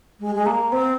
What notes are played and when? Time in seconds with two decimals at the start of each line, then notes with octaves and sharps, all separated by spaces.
0.20 G#3
0.35 G#3
0.46 A#3
0.72 C4